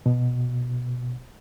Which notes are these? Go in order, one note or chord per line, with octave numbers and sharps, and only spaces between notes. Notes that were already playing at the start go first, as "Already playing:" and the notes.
B2